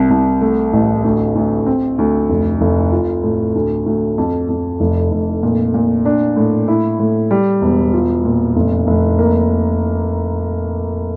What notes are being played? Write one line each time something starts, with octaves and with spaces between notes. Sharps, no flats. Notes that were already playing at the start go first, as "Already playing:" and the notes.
Already playing: C2
C2
A3
A1
D2
D2
C4
D2
F1
F1
F4
A2
D2
D2
F2
F2
F1
F1
A#2
A#2
D4
A2
E4
A2
G3
E1
F4
A#2
F1
F1
A#3